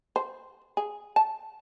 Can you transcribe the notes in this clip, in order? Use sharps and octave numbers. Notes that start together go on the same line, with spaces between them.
C5
G#4
A5